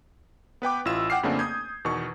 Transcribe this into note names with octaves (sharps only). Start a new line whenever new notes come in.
B3 B4 G5 D6
A1 E4 F4 E6 E7
F#5 G5 D6 F6 C7
F2 C#3 A3 A#3 C4 D4
D#6 G6 G#6
E2 B2 D#3 C#6